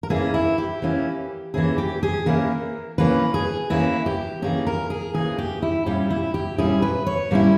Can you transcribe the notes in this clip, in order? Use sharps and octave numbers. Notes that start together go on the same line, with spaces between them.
A#4
E3 A#3 C#4 E4 G#4
E4
G4
E3 A#3 C#4 E4
E3 A#3 C#4 E4 G#4
G4
G#4
E3 A#3 C#4 E4 A#4
E3 A#3 C#4 B4
G#4
E3 A#3 C#4 E4
G4
E3 A#3 C#4 G#4
A#4
G#4
E3 A#3 C#4 G#4
G4
E4
A#2 G3 C#4 E4 G4
E4
G4
A#2 G3 C#4 E4 G#4
B4
C#5
A#2 G3 C#4 E4